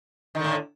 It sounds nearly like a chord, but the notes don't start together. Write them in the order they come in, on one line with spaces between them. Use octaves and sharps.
D#3 D3 A2